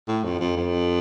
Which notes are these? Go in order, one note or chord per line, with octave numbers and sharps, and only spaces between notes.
A2
F2
F2
F2